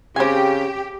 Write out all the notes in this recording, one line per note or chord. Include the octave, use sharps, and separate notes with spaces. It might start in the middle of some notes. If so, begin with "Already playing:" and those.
C#3 C4 G4 G#5